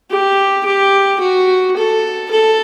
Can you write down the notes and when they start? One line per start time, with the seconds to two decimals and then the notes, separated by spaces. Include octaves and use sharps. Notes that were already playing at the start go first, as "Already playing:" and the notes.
0.10 G4
0.65 G4
1.20 F#4
1.76 A4
2.31 A4